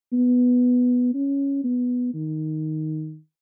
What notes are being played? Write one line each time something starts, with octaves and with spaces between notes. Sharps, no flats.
B3
C#4
B3
D#3